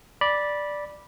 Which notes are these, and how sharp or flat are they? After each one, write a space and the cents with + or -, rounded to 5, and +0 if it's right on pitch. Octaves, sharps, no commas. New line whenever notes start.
D5 +0 B5 -15